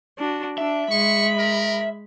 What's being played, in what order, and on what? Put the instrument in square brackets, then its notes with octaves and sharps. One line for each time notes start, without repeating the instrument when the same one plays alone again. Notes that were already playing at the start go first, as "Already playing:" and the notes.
[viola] D4 F#4
[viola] D4 [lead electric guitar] E5
[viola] G#3 B5 [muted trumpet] C#6
[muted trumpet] A#4